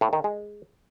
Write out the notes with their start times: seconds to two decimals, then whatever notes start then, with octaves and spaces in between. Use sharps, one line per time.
0.01 A2
0.13 D#3
0.24 G#3